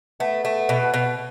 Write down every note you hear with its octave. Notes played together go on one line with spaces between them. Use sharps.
A3 B3
A3
B2
B2